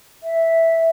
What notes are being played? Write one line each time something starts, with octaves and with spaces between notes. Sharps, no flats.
E5